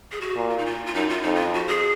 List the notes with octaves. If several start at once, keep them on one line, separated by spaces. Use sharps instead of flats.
G#4
F#4
A#2
F4
D#4
F4
F4
F#2 D#4
F4
F2 D#4
F4
F#4
G#4